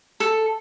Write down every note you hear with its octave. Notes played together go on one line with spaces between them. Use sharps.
A4